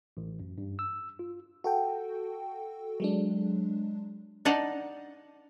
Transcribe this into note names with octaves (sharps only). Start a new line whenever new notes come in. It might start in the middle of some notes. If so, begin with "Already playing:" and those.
A1
F#2
G2
E6
F4
F#4 A4 G5
F#3 G#3 D4
D4 D#4 D5 F#5